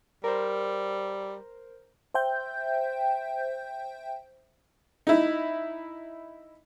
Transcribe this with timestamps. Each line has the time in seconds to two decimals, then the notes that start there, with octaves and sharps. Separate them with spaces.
0.24 G3 A#4 C5
2.14 C5 E5 G5 G6
5.07 D#4 E4